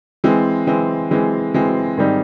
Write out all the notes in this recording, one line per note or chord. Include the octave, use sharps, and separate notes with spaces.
E3 G#3 C4
E3 G#3 C4
E3 G#3 C4
E3 G#3 C4
G#2 D#3 G3 C4 D#4